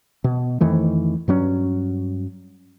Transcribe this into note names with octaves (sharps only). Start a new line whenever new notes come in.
B2
F2 D#3 E3 A3
G2 F#3 C#4